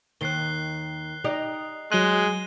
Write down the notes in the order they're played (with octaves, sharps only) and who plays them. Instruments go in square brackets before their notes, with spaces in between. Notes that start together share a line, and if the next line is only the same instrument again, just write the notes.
[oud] D#2 D#3 [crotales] F#6 C7 G7
[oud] D#4 G4 D5
[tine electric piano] F#3 F#6 [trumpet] G#3 [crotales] D#7 G7